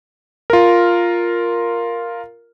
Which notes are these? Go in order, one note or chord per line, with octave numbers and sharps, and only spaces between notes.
F4 A#4